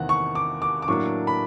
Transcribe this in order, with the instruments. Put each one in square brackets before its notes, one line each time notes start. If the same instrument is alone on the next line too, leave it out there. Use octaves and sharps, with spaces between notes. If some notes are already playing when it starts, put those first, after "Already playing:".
Already playing: [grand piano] E2 C3 D#3 A#3 F#5
C#6
D6
D6
D6
A2 F#3 A#3 D4 C#6
B5